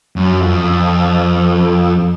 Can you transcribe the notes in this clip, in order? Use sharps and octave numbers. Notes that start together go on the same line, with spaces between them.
F#2
F2